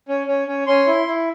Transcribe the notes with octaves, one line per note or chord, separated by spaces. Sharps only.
C#4
C#4
C#4
C#4 C6
E4
E4